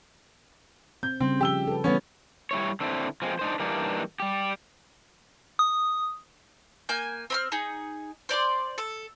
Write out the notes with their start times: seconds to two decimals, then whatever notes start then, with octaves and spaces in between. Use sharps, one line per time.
1.03 C4 G6
1.21 C#3 G3 C4
1.41 F3 G4 E6 G7
1.67 A4 B4
1.84 E3 G3 B3 C#4
2.51 G3 E4 C#5
2.81 D3 C4 D4 E4
3.22 F3 G#3 C4
3.39 D4 D#4 C5
3.60 E3 G3 A#3 D4 D#4
4.20 G3 G4
5.59 D#6
6.89 A#3 G#5 G6
7.30 C4 B5 F6
7.52 D#4 G#4
8.29 C5 D5 A#5 C6
8.78 A4